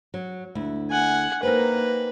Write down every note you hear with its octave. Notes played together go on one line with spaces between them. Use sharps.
F#3
D2 E4
F#5 G#5
A#3 C4 D#4 A#4 B4